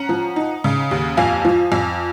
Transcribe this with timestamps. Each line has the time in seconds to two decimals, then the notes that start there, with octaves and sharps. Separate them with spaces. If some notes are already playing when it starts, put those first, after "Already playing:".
Already playing: C#4 F#5 A#5
0.09 F3
0.36 D#4
0.64 C#3
0.91 D#2
1.17 F2 F5 G#5
1.45 F3
1.72 F2